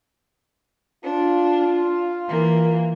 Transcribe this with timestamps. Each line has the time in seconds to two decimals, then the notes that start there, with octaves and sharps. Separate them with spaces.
1.04 D4 F4
2.28 E3 A#3